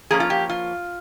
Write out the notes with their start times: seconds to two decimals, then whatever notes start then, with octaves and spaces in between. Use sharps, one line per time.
0.11 F3 A#3 C#4 G#4
0.20 F4
0.30 G4
0.49 F4